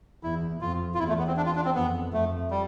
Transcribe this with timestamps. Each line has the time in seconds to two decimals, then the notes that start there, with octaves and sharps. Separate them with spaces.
0.23 E2 E4
0.61 F2 F4
0.94 F4
0.99 E2 E4
1.08 A3
1.18 B3
1.27 C4
1.37 D4
1.46 F4
1.56 D4
1.65 C4
1.75 F2 B3
2.13 F2 A3
2.51 G3